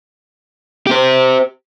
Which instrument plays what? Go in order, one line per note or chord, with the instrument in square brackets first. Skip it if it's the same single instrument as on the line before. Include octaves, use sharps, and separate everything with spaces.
[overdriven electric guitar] G4 C5